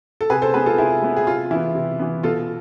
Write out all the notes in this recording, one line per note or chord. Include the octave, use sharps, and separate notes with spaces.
A4
C3 G#4 B4
A4 C5
G#3 B3 G#4 B4
F4 A4
C3 E4 G#4
G#3 B3
G#4
C3 F4
E3 B3 E4
C3
E3 B3
B2 F4 A4